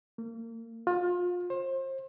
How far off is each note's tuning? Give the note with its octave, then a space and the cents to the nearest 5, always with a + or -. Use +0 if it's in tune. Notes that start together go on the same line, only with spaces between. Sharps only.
A#3 -30
F4 +30
C5 +30